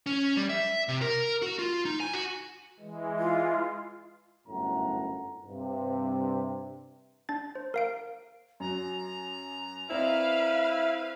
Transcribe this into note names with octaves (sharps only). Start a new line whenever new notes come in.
C#4
G3
E5
C3
A#4
F#4
F4
D#4
G#5
F#4
E3 G#3
F4
G1 F#2 A2 F#5 A#5
G2 C3
D4 A6
C5
A#4 F5 D7
F#2 F#3 A#5
C4 E4 B4 D5 D#5 F5